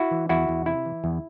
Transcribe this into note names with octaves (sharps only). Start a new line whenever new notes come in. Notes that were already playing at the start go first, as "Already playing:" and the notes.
Already playing: E4 F#4
E3
E2 E4 F#4
E2
C3 E4
E3
E2